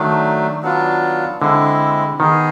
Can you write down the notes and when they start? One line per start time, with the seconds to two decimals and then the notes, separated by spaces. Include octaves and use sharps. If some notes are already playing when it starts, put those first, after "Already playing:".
Already playing: D#3 F#3 A3 D4
0.62 F#3 B3 D4 F4
1.41 D3 G#3 C4 E4
2.19 D#3 B3 D#4 G#4